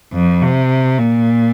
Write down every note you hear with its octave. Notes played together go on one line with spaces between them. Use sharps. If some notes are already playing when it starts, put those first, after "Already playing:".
F2
C3
A#2